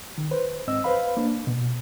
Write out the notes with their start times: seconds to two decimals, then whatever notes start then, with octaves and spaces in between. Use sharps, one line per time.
0.18 D#3
0.31 B4 C5
0.67 G#2 C4 D#5 E6
0.84 B4 C5 F5 B5
1.17 A#3 D4
1.47 B2